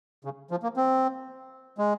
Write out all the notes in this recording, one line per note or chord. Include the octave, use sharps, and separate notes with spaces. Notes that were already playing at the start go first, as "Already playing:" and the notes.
C#3
F3
A#3
C4
G#3